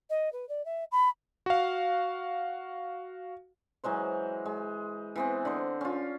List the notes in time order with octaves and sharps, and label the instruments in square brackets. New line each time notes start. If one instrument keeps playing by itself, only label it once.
[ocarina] D#5
B4
D5
E5
B5
[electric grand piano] F#4 F5
[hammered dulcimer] E3 F#3 G#3 C5
G#3
E3 B3 C4
D3 C5
C#4 F4